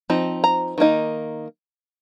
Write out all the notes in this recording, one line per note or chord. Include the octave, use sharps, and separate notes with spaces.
F3 C4 D#4
A#5
D#3 A#3 D#4